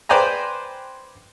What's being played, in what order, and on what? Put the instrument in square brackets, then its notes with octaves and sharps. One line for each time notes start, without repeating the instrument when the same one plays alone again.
[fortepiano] B4 C5 D5 G5 G#5 A#5